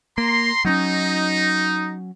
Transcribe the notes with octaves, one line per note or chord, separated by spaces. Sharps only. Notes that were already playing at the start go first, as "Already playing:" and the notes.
A#3 A#5 C6
F#3 C4 C#4 D#4